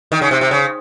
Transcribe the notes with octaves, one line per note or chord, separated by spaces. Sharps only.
D#3
C#3
C3
C3
C#3